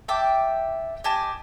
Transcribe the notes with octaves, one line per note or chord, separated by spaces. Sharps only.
E5 G5 A5 D6
G4 D#5 G#5 A5